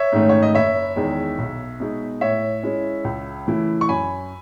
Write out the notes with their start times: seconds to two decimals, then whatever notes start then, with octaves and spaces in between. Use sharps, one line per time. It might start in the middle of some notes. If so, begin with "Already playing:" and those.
Already playing: C#5 E5
0.12 G#2 D#3 A3 C#4
0.29 C#5
0.43 D#5
0.55 F#1 C#5 E5
0.96 E2 D#3 G#3
1.38 B1
1.80 B2 G#3 D#4
2.21 A2 C#5 E5
2.63 G#3 C#4 E4
3.04 C#2
3.47 C#3 E3 A3 E4
3.81 C#6
3.89 F#2 G#5 B5